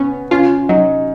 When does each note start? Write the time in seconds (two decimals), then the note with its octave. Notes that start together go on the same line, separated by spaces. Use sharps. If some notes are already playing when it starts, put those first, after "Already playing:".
Already playing: B3 C#4
0.31 C#4 F4
0.69 F#3 D#4